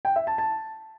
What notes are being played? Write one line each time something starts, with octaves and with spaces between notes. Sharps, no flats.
G5
E5
A5
A5